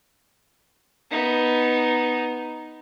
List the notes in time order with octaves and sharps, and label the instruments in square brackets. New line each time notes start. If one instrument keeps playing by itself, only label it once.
[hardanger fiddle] B3 D#4